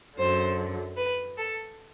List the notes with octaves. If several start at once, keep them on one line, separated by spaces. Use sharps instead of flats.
F#2 D3 F#3 C5
B4
A4